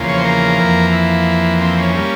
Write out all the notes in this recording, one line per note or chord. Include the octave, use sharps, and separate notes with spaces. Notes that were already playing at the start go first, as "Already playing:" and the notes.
Already playing: E2 C#3 F3 A#3
C#5
C5
A#4
F2 E3 A#3
E4
C4
C#4
G3 A#3